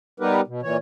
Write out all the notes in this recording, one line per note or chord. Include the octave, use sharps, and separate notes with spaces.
G3 B3 D#4 G4 A#4 B4
B2
A#2 E3 C#5